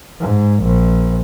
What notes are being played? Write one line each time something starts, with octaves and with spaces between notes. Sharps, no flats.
G#2
A#1